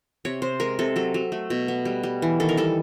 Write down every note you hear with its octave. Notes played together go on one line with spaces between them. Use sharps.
C3 C#5
C3 C5
G#3 A#4
C3 A4
F#3 A4
F#3
A3
B2
B3
G3
G3
E3
D#3 A4
A#4
G3 A4